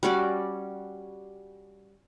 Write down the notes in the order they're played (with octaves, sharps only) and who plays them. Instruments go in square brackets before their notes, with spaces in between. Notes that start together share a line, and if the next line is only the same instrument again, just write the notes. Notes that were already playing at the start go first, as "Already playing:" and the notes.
[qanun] G3 C#4 F#4 D5